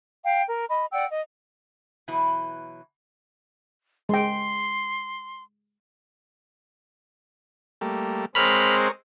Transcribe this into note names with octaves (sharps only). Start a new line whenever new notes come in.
F5 G5
A#4
D#5 B5
D5 F#5 G5 E6
D#5
B2 E3 F#3 E4
G#3 G5 C6
G3 A3 A#3
G#3 C4 A#4 C#5 B5 F6